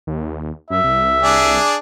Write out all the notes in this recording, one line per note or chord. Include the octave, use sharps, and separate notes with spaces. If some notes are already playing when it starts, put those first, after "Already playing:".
D#2
F#2 E5
C2
D4 G#4 D5